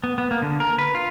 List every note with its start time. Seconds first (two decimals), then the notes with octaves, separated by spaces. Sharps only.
0.04 B3
0.18 B3
0.31 A#3
0.42 D3
0.60 A#4
0.79 B4
0.95 F4